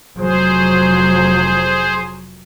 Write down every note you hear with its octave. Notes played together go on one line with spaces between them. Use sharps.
F1 F#3 G#4 C5